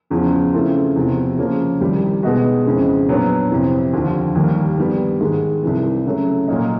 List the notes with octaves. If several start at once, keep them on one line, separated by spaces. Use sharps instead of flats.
E2 C#3 F3
C#3 E3 A3 C4 F4
E2 C3 F3
C#3 F3 A#3 C#4
C2 C3 D#3 G3
B2 G#3 B3 D#4 F#4
F2 C#3 E3 G#3
A#2 F#3 B3 D4
F2 C3 E3
D#2 D3 F3
D#2 D#3 G3 A#3
G2 D#3 G3 B3
G#2 D#3 G#3
C2 C3 E3
C#3 F#3 A3
A#2 F#3 A#3 D#4